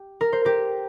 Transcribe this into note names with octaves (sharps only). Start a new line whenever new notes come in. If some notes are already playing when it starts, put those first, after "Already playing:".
Already playing: G4
A#4
C5
G4 A#4